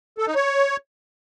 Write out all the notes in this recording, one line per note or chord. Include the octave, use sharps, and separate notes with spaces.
A4
D#4
C#5